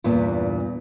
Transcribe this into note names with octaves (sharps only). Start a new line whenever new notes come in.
E2 G2 A#2